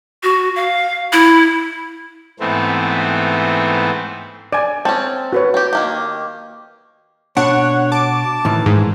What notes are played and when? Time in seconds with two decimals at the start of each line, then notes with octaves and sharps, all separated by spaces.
0.23 F#4
0.56 F5
1.13 E4
2.40 G#2 E3 A3 B3 C4
4.53 D5 G#5
4.85 C4 C#4 A5
5.33 F#4 B4 C#5
5.54 C4 G4
5.73 D#3 A#3 G4
7.37 B2 D4 C#5 F#5
7.92 A5 D6
8.45 A2 D#3 E3
8.66 G#2